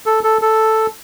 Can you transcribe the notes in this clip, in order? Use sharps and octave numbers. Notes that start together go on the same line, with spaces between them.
A4
A4
A4